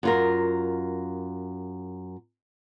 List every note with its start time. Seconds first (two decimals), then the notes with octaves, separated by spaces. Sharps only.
0.03 F#2 F4 A#4